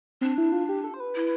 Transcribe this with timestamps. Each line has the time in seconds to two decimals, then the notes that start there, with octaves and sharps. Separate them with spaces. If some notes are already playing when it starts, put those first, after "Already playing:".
0.21 C4 D4
0.38 E4
0.52 F4
0.69 G4
0.84 A4
0.94 C5
1.00 B4
1.15 E4